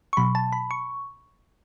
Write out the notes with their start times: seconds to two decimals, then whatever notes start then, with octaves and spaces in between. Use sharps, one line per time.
0.13 C#6
0.17 B2 F#3 B5
0.35 A5
0.53 B5
0.71 C#6